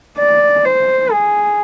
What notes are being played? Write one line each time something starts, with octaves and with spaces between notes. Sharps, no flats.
D5
C5
G#4